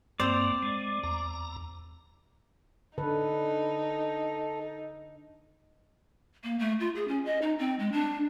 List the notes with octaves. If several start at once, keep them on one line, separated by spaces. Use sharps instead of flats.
G2 A#3 C4 C5 D5
G#3
E2 A#5
D3 D#4 A4 B4
A#3
A3
F4
G#4
C#4
D#5
D#4
C4
G#3
D4